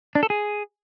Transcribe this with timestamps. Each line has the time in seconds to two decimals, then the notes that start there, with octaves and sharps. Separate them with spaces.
0.15 D4
0.23 A4
0.30 G#4